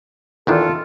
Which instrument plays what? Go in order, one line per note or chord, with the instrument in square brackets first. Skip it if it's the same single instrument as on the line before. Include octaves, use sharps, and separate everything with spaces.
[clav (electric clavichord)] E2 D#3 D4 [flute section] F4 A4